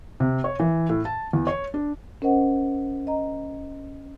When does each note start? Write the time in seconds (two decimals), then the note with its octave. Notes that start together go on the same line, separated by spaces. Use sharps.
0.20 C3
0.44 C#5
0.59 E3
0.89 A2
1.05 A5
1.33 E2
1.47 C#5
1.74 D4
2.22 C#4 A#4 C5 D#5 F#5
3.07 D#5 A#5